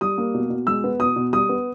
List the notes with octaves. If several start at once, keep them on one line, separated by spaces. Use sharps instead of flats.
G3 D#6
A#3
B2
B2
G#3 E6
B3
B2 D#6
B2
G3 D#6
B3